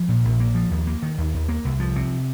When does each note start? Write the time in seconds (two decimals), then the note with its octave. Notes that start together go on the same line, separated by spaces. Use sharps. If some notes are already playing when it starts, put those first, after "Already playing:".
Already playing: F3
0.09 A#2
0.25 A#1
0.40 A#3
0.55 F3
0.71 D#2
0.87 A#3
1.03 D#3
1.18 D#2
1.34 D#2
1.49 A#3
1.65 C2
1.80 F3
1.96 C3